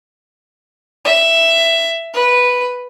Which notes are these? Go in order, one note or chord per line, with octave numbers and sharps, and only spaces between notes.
E5
B4